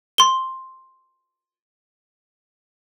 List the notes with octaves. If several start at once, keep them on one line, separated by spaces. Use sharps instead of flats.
C6 G7